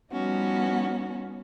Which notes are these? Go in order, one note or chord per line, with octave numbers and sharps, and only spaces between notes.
F3 G3 B3 C#4 D#4 F#4